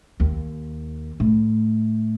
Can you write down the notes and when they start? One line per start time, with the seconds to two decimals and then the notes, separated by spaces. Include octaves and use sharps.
0.20 D#2
1.20 A2